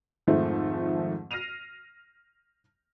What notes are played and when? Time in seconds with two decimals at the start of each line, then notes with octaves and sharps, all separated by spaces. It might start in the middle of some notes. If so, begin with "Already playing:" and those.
0.27 F2 G#2 D#3 F3 A3 C4
1.31 F6 A#6 C7 D#7 F7